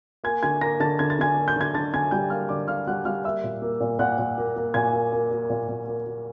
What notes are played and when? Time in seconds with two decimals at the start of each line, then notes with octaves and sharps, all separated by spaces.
0.24 A#3 G#5 G#6
0.43 D3 G#5 G#6
0.61 A#3 A#5 A#6
0.80 D3 A5 A6
0.99 D3 G#6
1.10 A6
1.19 D3 G#5 G#6
1.36 A#3
1.48 G6
1.56 D3 G#6
1.74 D3 A5 A6
1.93 D3 G#5 G#6
2.11 G3 G5 G6
2.30 A#3 F5 F6
2.49 D3 D5 D6
2.68 D3 F5 F6
2.87 G3 F#5 F#6
3.05 G3 F5 F6
3.24 A#3 E5 E6
3.44 A#2
3.62 A#3
3.80 A#2
3.99 A#2 F#5 F#6
4.18 A#2
4.38 A#3
4.56 A#3
4.74 A#2 G#5 G#6
4.93 A#3
5.12 A#3
5.31 A#3
5.50 A#2
5.68 A#2
5.87 A#3
6.06 A#3